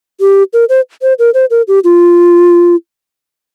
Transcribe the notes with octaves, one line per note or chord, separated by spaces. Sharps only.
G4
A#4
C5
C5
A#4
C5
A#4
G4
F4